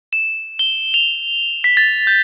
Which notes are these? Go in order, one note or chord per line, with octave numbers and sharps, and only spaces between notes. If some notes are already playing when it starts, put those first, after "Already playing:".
E7
G7
F7
B6
A6
G6